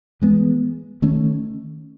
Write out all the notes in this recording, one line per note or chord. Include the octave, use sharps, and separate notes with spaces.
E3 G#3 B3
D#3 A3 C#4